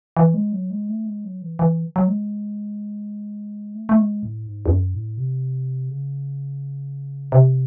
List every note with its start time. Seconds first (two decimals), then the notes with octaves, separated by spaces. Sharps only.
0.17 E3
0.34 G#3
0.53 F#3
0.70 G#3
0.89 A3
1.06 G#3
1.24 F#3
1.42 E3
1.59 E3
1.96 F#3
2.08 G#3
3.74 A3
3.89 A3
3.98 G#3
4.23 A2
4.46 G#2
4.66 E2
4.70 F#2
4.94 A2
5.17 C3
5.89 C#3
7.32 C3